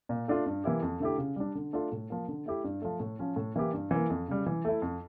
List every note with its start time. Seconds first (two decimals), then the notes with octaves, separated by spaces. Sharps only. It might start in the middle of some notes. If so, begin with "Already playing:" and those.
0.09 A#2
0.28 A3 D4 F4
0.46 G2
0.64 E3 A#3 E4 G4
0.82 F2
1.00 D3 A3 E4 G4
1.18 C#3
1.36 G3 D4
1.55 D3
1.73 A3 D4 F4
1.92 A2
2.10 F3 A#3
2.28 D3
2.46 A3 E4 G4
2.64 G2
2.82 F3 A3
3.00 A2
3.19 F3 C#4
3.36 A2
3.56 E3 A#3 E4 G4
3.73 G2
3.91 E3 A#3
4.10 F2
4.28 C#3 G3
4.46 E3
4.65 A3 E4
4.82 F2